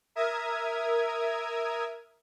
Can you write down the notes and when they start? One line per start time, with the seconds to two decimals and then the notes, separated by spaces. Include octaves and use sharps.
0.15 A#4 E5 D#6 G#6